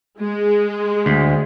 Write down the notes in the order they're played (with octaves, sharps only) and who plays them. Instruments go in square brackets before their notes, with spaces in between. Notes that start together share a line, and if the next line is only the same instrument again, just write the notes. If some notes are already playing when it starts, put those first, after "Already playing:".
[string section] G#3
[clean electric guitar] D2